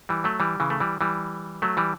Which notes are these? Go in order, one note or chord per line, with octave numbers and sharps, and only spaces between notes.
E3 G3
F#3 A3
E3 G3
C#3 E3
A3
E3 G3
E3 G3
F#3 A3
E3 G3